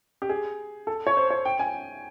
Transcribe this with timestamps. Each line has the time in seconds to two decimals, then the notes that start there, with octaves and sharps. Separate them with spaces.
0.22 G4
0.29 G#4
0.87 A4
1.07 C#5
1.17 C5
1.30 C#5
1.45 G5
1.59 G#5